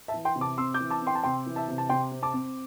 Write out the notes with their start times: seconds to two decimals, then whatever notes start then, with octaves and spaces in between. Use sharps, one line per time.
0.08 E5 A5
0.14 E3
0.25 G5 C6
0.36 C3
0.41 A5 D6
0.58 C4 C6 E6
0.74 D6 G6
0.80 E3
0.90 A5 D6
1.01 C4
1.07 G5 C6
1.15 A5
1.23 C3 G5 C6
1.46 E3
1.56 E5 A5
1.68 C3
1.78 A5
1.89 C3 G5 C6
2.11 C4
2.23 A5 D6
2.34 C4